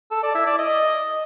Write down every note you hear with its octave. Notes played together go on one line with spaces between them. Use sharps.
A4
D5
E4
D5
D#5